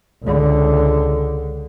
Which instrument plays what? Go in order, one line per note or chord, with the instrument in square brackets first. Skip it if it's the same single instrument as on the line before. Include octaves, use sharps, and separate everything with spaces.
[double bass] C#2 D3